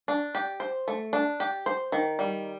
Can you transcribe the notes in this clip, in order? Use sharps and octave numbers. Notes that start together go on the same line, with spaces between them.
D4
G4
C5
A3
D4
G4
C5
D#3
G3